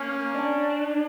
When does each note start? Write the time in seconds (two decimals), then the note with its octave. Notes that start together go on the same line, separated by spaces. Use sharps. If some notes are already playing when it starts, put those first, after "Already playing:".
Already playing: A#3 C#4
0.34 D4